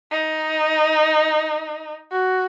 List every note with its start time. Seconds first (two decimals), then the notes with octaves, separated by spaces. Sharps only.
0.11 D#4
2.11 F#4